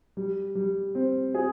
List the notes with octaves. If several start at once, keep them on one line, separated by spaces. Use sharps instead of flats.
G3
G3
C4
G#4